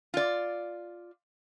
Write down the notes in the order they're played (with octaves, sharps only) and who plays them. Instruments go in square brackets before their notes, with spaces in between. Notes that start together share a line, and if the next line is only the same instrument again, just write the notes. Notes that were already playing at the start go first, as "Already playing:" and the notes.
[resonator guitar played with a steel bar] F4 D5